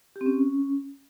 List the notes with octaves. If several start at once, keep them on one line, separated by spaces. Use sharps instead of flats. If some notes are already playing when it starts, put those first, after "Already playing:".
G4
C4
C#4